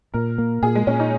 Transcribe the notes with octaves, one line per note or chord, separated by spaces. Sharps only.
A#2 A#4
A#3
A#2 G#4
G#3
A#2 C#4
D#4